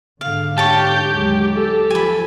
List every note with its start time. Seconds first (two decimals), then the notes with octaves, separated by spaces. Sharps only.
0.21 G#2 D3 F5
0.58 G4 C#5 A5 G6
1.10 D#2 F#3 G#3
1.56 A4
1.90 F3 G#5 B5